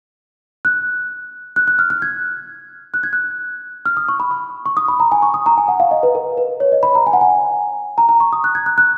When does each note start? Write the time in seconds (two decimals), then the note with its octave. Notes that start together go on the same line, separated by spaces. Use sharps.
0.65 F#6
1.56 F#6
1.68 F#6
1.79 F6
1.90 F#6
2.02 G#6
2.94 F#6
3.03 G#6
3.13 F#6
3.86 F6
3.97 D#6
4.09 C#6
4.20 B5
4.31 C#6
4.66 C#6
4.77 D#6
4.88 B5
5.00 A#5
5.12 G#5
5.22 C#6
5.34 D#6
5.46 A#5
5.58 G#5
5.68 F#5
5.80 F5
5.91 D#5
6.03 B4
6.15 A#4
6.37 B4
6.60 C#5
6.72 D#5
6.83 B5
6.95 A#5
7.07 G#5
7.13 F#5
7.21 G#5
7.98 A#5
8.09 A#5
8.20 C#6
8.33 D#6
8.44 F#6
8.55 G#6
8.66 F#6
8.78 F#6